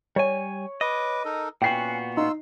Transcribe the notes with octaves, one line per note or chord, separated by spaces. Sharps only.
G3 C#5 G#5
B4 D#5 D6
D#4 A4 A#4
A#2 B3 C#4 F#4 G5 C7
D#4 F4 C6 E6